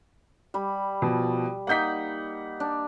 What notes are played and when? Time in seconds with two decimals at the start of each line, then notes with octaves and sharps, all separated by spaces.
0.54 G3 B5
1.02 B2 F3
1.67 A#3 D#4 F#5 G6 B6
2.60 D4